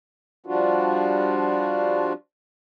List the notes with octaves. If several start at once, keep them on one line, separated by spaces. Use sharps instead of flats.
F3 G3 D4 F4 F#4